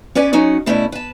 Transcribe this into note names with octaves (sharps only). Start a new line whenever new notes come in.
C#4 B4 D5 G#5
F#3 C#4 D#4 F#4
B2 A3 C#4 D4 E4
B4 A5